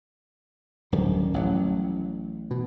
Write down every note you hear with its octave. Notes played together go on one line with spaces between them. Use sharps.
D1 F#2 D#3 G3
A1 F#3
B2